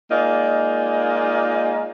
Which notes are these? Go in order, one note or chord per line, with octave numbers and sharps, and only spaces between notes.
G#3 A#3 D#4 F4 D5